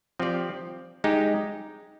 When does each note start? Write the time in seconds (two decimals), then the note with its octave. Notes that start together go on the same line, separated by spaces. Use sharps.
0.19 F3 C4 G4 D5
1.04 G#3 D#4 G4